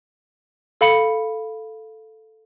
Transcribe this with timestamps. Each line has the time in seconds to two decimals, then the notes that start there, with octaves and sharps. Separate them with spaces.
0.81 A4 F5 B5 C#7